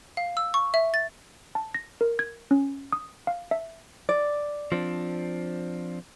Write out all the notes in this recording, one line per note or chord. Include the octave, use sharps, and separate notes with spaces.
F5
E6
C#6
E5
A6
A5
A#6
A#4
G#6
C#4
D#6
F5
E5
D5
F3 C4 D4